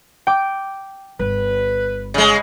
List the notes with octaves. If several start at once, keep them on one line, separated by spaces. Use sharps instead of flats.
G5 D6
G1 B4
C#3 G#3